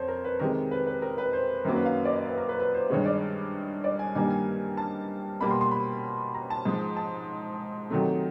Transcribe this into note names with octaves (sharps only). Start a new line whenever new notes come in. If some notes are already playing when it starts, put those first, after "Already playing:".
Already playing: F2 C5 C#5
A#4
B4
C3 D#3 G#3 A#4
B4
B4
A#4
B4
C5
F#2 D#3 F#3 A#3 A#4
B4
F5
D5
D#5
B4
A#4
B4
B4
C5
G2 D#3 G#3 C#5
D5
D5
G#5
G2 D#3 G3 A#3 G#5
G#5
A5
B2 G3 A#3 B5
C6
C6
B5
A#5
A5
G#2 F3 G#3
A5
C3 D#3 F#3 A3